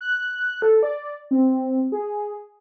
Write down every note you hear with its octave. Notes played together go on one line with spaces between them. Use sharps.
F#6
A4
D5
C4
G#4